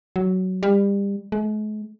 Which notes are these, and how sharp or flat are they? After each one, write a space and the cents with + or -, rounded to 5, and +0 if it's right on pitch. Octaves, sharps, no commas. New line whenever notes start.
F#3 +10
G3 +30
G#3 +45